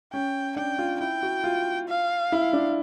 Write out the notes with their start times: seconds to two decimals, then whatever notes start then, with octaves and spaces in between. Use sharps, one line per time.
0.13 C#4 G5
0.56 D4 G5
0.79 F4
1.00 E4 G5
1.23 F#4
1.44 F4
1.88 F5
2.32 E4
2.53 D4